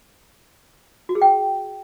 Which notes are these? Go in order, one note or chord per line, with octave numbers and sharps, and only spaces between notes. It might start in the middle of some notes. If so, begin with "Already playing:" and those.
F#4
G#4
G5